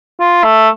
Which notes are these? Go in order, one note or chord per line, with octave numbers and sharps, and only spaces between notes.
F4
A3